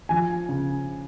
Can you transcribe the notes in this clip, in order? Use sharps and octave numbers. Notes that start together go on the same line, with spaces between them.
F3 G#5
C#3